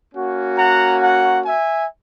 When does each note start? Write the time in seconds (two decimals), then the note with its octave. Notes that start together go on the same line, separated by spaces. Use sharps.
0.13 A#3 C#4 F#4
0.57 F#5 A#5
1.02 F#5 A#5
1.46 E5 G#5